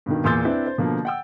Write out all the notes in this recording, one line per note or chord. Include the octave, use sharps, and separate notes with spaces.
G2 B2 D#3
E2 A#2 C6 E6 G6 A6
C4 D4 E4 B4
C5
B2 D3 F3 A#3
F#5 G5 E6